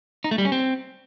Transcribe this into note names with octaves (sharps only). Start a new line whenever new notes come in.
D#4
A3
G3
C#4
C4